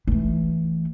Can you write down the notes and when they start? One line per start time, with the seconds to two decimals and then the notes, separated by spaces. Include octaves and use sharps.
0.07 E3 A3